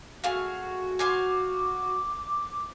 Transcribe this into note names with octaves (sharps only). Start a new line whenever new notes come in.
A3 F#4 G#4 F5
C5 F5 G#5 D6